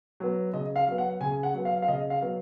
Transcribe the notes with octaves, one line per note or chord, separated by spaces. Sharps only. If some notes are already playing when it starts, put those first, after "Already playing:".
F#3 B3
C#3 D#5
F5
F#3 B3
F#5
C#3 G#5
F#5
F#3 B3
F5
F5
C#3 D#5
F5
F#3 B3